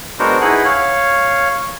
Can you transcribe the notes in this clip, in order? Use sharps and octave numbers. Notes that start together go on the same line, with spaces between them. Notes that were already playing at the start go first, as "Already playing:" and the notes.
G#3 B3 D4 F#4 A#4 C5
D#4 E4 G#4 B4 F#5
C#5 F5